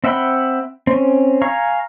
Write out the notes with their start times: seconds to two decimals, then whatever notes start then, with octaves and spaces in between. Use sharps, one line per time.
0.04 C4 E5 F#5 G5 B5
0.87 C4 C#4
1.42 F5 G#5 A#5 C#6